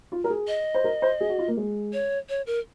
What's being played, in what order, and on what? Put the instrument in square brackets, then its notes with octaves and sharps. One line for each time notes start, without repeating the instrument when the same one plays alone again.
[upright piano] F4
A#4
G#4
[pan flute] D#5
[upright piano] C5
A#4
C5
G#4
F#4
F4
A#3
G#3
[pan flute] C#5
C#5
A#4